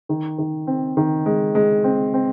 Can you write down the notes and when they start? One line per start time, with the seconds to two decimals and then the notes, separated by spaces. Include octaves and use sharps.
0.09 D#3
0.38 D#3
0.67 C4
0.97 D#3
1.26 G#3
1.55 G#3
1.84 C4
2.14 C4